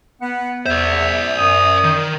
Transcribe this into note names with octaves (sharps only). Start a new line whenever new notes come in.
B3 F#5
E2 C5 D5 E5
F#2 D#6
D#3